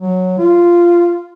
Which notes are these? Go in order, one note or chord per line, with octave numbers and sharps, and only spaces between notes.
F#3
F4